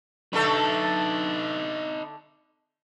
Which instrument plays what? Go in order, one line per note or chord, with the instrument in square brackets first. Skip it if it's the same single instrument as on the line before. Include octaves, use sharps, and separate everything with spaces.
[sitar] D3 A3 A4 [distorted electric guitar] D#4 B4